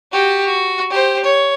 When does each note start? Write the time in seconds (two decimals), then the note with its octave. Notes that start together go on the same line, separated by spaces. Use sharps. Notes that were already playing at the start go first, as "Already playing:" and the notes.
0.12 F#4 G4
0.46 F#4
0.90 G4 C5
1.24 C#5